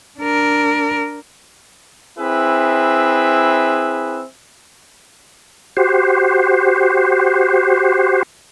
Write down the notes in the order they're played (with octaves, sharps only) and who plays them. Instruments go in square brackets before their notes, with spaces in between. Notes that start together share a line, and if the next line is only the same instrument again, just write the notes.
[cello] D4 A#4
[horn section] C4 E4 G#4 B4 E5
[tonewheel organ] F#4 G4 C5